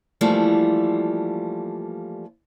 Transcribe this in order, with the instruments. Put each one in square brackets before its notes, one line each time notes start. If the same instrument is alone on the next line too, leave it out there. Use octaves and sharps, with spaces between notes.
[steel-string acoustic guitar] E3 F3 G3 A3 A#3